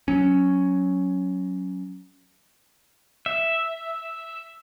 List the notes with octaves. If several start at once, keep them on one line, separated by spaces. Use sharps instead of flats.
F#3 C#4
E5